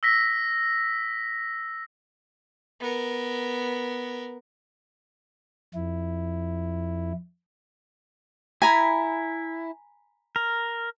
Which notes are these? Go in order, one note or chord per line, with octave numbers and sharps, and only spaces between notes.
E6 A#6 B6
B3 A#4
F2 E4
E4 G#5 A#5 B5
A#4